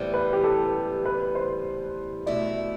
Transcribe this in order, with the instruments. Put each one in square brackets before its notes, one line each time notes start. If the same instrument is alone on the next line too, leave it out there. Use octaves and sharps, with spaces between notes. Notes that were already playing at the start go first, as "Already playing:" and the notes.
Already playing: [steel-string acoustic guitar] A2 E3 G3 B3 [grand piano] C5
[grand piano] B4
G4
A4
B4
C5
[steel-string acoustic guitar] B2 A3 E4 [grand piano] D5